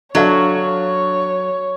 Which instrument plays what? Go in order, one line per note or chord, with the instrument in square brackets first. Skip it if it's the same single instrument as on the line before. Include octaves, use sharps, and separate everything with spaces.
[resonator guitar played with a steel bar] F#3 [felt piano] D4 A4 F5 [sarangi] C#5